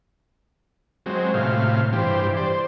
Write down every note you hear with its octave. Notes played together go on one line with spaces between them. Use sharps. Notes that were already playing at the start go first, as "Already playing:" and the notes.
F#3 G#3 C4
A2 C3 F5
G2 E3 G4 C5
C5 D5
C5